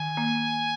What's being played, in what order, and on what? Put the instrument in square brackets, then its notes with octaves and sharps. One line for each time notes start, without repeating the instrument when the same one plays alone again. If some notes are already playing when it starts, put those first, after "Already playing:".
Already playing: [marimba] D#3 [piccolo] G#5
[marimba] A#3